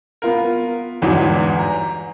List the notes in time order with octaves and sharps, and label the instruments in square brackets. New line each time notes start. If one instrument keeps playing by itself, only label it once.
[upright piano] B3 F4 A#4
G1 E2 G#2 F#3
A#5